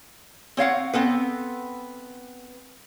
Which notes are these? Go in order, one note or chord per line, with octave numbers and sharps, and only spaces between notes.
C4 C#5 F5 F#5
B3 C4 A4 B4